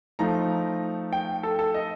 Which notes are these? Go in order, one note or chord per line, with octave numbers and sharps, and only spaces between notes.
F3 A3 D#4 A#5
G5
A4
A4
D#5